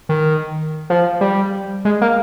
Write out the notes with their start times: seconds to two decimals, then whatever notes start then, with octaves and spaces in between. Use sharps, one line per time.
0.09 D#3
0.90 F3
1.21 G3
1.85 G#3
2.02 A#3